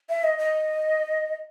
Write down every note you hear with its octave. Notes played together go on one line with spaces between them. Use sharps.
E5
D#5
D#5